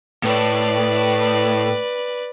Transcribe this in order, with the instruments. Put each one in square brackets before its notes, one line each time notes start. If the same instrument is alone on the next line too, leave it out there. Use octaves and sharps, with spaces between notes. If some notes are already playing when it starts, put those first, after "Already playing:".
[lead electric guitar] A2 [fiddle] B4 D5